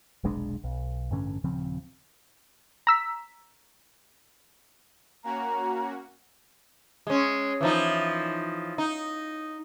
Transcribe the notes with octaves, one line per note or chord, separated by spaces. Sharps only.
F1 B1 G#3 D4
B1
A1 G2 D3 C#4
D#1 C#3 F3 C4
A#5 E6 B6
A#3 C#4 F#4 A#5
G#3 C#4
E3 F3 D#4
D#4